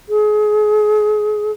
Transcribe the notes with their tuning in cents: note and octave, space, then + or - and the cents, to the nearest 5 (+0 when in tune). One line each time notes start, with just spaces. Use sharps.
G#4 +30